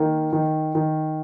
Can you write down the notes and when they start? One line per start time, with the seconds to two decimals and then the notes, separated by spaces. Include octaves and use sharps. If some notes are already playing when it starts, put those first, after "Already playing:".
Already playing: D#3 A#3
0.33 D#3
0.75 D#3